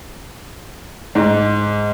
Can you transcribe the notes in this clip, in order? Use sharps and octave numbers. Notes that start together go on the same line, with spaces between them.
G#2